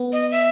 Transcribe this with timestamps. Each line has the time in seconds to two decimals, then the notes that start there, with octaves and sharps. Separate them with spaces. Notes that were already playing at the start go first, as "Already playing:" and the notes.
Already playing: B3
0.12 D#5
0.31 E5